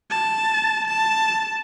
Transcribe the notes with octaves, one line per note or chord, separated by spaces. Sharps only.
A5
A5